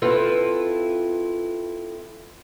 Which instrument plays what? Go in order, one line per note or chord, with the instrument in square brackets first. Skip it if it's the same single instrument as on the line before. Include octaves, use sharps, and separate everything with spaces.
[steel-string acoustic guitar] C4 E4 F4 A4 B4